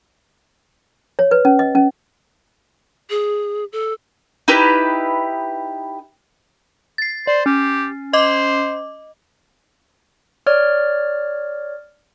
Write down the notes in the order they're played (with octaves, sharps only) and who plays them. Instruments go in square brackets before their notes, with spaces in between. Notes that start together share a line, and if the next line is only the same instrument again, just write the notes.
[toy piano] C#5
B4
C#4
D#5
C#4
[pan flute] G#4
A4
[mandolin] D#4 E4 G4 B4
[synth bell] A6 C7
[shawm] C5 [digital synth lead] D5
[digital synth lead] C#4 [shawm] G4
[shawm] C5 [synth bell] D#5 D6
[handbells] C#5 D5 F6